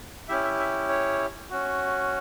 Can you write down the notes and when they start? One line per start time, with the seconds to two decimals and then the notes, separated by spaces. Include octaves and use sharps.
0.28 C#4 E4 G4 E5
0.44 E5
0.59 E5
0.89 C#5
1.50 C#4 F#4